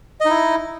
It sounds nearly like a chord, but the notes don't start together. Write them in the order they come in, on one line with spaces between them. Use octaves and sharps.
D#5 D#4 E4